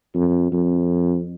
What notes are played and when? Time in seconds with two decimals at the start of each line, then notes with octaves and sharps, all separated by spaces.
0.15 F2
0.52 F2